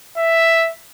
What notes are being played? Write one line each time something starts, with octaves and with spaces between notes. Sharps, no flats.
E5